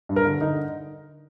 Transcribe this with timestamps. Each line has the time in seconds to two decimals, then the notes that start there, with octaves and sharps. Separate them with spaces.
0.09 G2
0.16 A#4
0.25 D3
0.41 D3 D#4